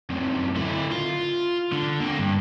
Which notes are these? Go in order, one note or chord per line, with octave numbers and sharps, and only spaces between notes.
F#2 C3
D3 E4
F4
D3
A#3 C4
G2